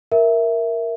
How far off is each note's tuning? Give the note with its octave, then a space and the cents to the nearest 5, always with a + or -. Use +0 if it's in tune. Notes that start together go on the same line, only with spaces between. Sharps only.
A#4 +0 E5 +0